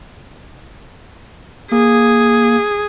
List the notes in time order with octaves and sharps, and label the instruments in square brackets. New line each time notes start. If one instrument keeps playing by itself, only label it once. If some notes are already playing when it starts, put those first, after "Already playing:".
[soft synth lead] A#3 [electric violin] G#4